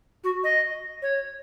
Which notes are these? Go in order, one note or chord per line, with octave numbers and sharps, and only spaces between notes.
F#4
D#5
C#5